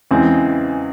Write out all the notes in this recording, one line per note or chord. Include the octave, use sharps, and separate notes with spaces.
E2 C#3 E3 G#3 C4